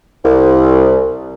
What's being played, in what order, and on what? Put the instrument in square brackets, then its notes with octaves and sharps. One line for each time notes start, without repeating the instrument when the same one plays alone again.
[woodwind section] C2